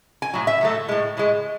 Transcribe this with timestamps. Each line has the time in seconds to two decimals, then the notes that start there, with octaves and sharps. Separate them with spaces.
0.22 G#5
0.34 A2 F#3
0.47 E5
0.61 A2 F#3 A3
0.89 A2 G#3
1.17 A2 G#3